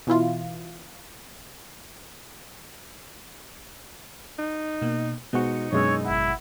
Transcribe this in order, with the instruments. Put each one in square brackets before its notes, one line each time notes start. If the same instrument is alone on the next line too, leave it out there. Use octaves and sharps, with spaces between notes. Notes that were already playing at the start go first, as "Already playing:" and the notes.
[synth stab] B2 E3 E4 F4
[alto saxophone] D#4
[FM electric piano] B2 A#3
[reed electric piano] B2 G#3 F#4 [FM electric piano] B3 C5 C#7 [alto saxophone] D#4
[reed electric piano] F#2 B2 G#3 [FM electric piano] D4 E6 [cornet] C#5
[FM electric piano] G#1 F#5 [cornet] E4